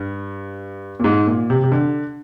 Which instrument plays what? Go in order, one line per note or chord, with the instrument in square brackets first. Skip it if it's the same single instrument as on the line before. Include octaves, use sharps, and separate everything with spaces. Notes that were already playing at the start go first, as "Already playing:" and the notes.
Already playing: [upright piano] G2
A#2
G#2
A#2
C3
C3
D3